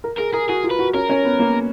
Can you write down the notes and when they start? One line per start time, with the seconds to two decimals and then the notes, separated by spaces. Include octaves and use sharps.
0.04 A#4
0.18 G#4 A#4
0.33 G#4 A#4
0.49 F#4 G#4
0.64 F4
0.71 B4
0.79 F#4
0.94 C#4 A#4
1.10 C#4
1.25 B3
1.39 A#3